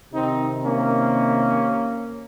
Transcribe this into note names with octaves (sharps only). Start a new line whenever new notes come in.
C3 D#3 C4 D#4
A#3 C#4